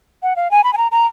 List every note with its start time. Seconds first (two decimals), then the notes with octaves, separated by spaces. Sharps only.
0.23 F#5
0.36 F5
0.51 G#5
0.64 B5
0.73 G#5
0.77 A#5
0.92 A#5